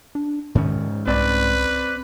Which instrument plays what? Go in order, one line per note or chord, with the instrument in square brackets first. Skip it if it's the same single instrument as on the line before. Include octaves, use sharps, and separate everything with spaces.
[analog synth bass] D4
[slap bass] G#2 C#4 [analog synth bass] D#3
[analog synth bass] C2 [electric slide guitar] C4 D5 [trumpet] B4